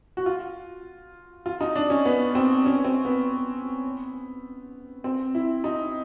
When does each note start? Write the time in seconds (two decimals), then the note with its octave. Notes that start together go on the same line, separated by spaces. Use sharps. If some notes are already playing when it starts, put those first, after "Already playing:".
0.17 F#4
0.26 F4
1.46 F4
1.61 D#4
1.76 D4
1.90 C#4
2.05 B3
2.35 C4
2.66 C#4
2.84 C4
3.05 B3
5.04 C4
5.35 E4
5.64 D#4